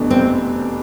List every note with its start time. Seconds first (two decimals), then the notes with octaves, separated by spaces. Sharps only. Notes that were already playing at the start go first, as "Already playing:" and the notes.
Already playing: F1 E2 B2 A3 D4
0.10 C4